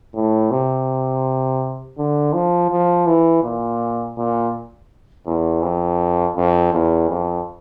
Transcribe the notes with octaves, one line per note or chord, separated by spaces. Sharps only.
A2
C3
D3
F3
F3
E3
A#2
A#2
E2
F2
F2
E2
F2